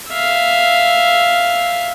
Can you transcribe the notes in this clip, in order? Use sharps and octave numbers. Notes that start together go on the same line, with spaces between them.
E5 F5